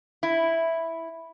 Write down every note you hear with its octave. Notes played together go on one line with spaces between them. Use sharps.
E4